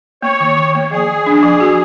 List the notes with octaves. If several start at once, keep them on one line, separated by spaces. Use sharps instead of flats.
A#3 C#5
D#3
D#3
A#3
F3 G#4
F3
D4
F3
F#4